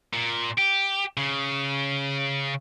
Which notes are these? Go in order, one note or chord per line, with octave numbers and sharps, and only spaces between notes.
A#2
G4
C#3